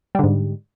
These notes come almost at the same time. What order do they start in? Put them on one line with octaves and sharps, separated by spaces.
G3 D3 G#2